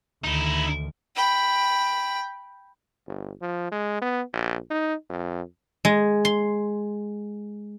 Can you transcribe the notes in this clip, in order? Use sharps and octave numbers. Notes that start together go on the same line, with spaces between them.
D2 D#3 D#4 E4
G5 B5
G1
F3
G#3
B3
A#1
D#4
F2
G#3
C6